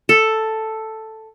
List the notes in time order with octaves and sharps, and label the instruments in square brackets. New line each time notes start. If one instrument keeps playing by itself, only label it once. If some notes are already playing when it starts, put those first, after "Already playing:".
[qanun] A4